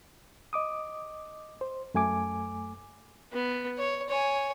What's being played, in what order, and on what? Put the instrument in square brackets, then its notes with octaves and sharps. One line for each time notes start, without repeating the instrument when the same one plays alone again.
[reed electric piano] D#5 D6 D#6
C5
F#2 A3 G#5 D6
[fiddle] B3
C#5
C#5 G#5